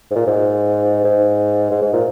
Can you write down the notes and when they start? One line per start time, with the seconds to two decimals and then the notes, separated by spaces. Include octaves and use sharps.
0.11 G#2
0.15 A#2
0.27 G#2
1.04 G#2
1.71 G#2
1.82 G#2
1.93 A#2